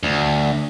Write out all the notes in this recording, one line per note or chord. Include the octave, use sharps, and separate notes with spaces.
D2